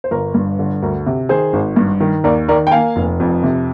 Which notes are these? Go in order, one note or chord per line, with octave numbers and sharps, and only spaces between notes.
C5
G1 A#4
G2
D3
D2 A#4
C3
D#3 G#4 C5
G#1
G2
D#3
D#2 A#4 D5
D#3 A#4 D5
G5
A#3 F5 G#5
F1
F2
C3